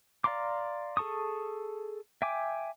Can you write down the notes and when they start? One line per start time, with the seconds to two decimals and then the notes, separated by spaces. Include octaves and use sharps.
0.24 D5 F5 A#5 C6 D6
0.97 G#4 A4 A5 C#6 D#6
2.22 E5 G5 G#5 D6